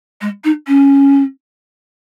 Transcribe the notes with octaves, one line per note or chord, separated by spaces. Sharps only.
G#3
D#4
C#4